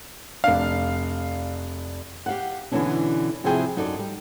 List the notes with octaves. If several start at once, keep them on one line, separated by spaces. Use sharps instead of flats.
F1 D4 F5
G4 F5 F#5
B2 D3 E3 G#3 C#4 D4
C3 F3 E4 F#4 G#4 G5
F#2 D#4 F#4 A4 D5
G3